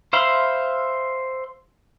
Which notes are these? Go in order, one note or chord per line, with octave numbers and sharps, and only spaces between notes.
C5 E5 F5 B5 C6